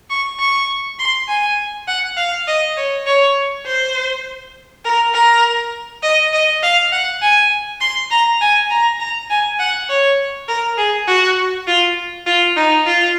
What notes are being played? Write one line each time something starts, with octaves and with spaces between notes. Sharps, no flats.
C#6
C#6
C6
G#5
F#5
F5
D#5
C#5
C#5
C5
A#4
A#4
D#5
D#5
F5
F#5
G#5
C6
A#5
G#5
A#5
A#5
G#5
F#5
C#5
A#4
G#4
F#4
F4
F4
D#4
F4